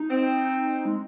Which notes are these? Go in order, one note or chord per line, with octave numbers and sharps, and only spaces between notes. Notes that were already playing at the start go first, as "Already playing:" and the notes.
Already playing: D#4
C4
G#3